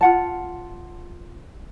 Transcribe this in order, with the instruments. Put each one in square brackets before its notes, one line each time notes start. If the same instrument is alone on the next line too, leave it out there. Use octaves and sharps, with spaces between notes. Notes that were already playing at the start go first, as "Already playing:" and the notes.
[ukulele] F4 F#5 A5